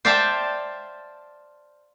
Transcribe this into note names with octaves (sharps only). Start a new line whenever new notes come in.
C5 D5 E5 F5 G5 A5